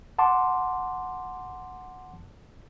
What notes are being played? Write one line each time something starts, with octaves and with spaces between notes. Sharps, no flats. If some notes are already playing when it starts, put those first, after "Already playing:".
F#5 A5 C6 D6